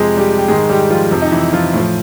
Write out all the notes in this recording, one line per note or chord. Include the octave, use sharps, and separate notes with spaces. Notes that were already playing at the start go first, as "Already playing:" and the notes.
Already playing: F2 C3 F3 G#3 G#4
G3 G4
G4
G#2 D#3 G#3 G#4
G3 G4
F3 F4
F2 C3 F3
D#4
E3 E4
F3 F4
A2
F3